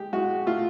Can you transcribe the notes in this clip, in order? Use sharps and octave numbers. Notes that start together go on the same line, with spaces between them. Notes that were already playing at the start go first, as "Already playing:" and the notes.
Already playing: G#3 G4
G#3 F#4
A3 F4